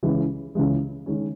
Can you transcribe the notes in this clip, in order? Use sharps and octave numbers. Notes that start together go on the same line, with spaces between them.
C#2 C#3 E3 G#3
C#2 C#3 E3 G#3
D#3 G#3 C#4